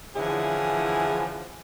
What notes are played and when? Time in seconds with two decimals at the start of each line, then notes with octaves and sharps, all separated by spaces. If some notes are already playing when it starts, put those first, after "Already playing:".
0.16 D3 E3 F3 C#4 E4 G#4